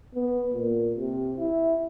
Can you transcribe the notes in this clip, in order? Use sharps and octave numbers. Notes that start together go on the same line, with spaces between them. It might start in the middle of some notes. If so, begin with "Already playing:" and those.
B3
A#2
C3
E4